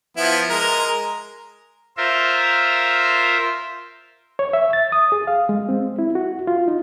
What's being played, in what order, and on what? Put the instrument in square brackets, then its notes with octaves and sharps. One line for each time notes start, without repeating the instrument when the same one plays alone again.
[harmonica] F3 B3 E4
G#3 A#4
[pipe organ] F4 A#4 C5 E5
[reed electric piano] C#5
E5
A6
D#6
G#4
F5
G#3
C4
E4
F#4
F4
D#4